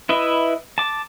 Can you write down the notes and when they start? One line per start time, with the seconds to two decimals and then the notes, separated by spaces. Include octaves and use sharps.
0.09 E4 B4 D#5 E5
0.78 A5 D6